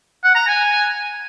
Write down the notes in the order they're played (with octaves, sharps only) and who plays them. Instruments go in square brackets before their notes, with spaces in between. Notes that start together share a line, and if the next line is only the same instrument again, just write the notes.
[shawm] F#5
A#5
G#5